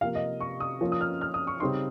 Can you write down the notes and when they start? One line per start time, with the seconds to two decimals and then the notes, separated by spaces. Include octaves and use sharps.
0.01 C3 F3 A#3 F5
0.15 D#5
0.41 C#6
0.60 D#6
0.81 F3 A#3 C#4 F4
0.92 D#6
1.01 F6
1.21 F6
1.34 D#6
1.47 C#6
1.60 C#3 G3 C4 D#4 C6